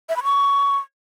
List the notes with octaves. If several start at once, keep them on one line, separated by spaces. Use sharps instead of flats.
E5
B5
C#6